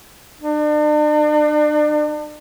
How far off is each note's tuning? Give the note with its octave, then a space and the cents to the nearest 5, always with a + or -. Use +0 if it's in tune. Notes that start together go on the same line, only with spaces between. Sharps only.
D4 +40